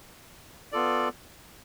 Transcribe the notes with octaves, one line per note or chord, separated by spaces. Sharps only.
B3 F4 A4 D5